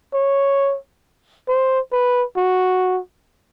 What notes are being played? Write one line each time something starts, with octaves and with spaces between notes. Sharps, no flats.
C#5
C5
B4
F#4